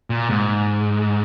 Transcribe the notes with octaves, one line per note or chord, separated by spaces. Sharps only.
A#2
G#2